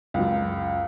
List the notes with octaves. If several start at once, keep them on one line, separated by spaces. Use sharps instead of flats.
C#2 F#2